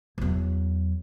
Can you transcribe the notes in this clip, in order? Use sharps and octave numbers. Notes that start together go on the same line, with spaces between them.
E2 F#3